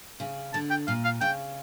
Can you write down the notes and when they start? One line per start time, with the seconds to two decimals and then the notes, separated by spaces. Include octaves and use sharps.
0.20 C#3
0.54 D3 A5
0.70 G5
0.87 A#2 F5
1.04 F5
1.21 C#3 G5